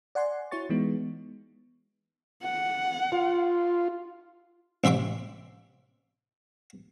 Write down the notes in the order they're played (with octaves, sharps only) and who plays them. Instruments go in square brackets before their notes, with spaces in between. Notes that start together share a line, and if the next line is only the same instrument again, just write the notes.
[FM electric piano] D5 F#5 G#5 C6
E4 F#4 C#5 C#6 A6
E3 G#3 B3 D#4
[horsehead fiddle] F#5
[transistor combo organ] F4
[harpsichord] A1 C3 E5 C6 D6